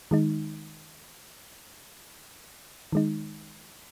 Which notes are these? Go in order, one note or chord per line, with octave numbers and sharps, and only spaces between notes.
D#3 G#3 D#4
D#3 G#3 D#4